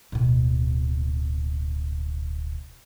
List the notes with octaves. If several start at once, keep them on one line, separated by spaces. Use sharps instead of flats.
D1 B2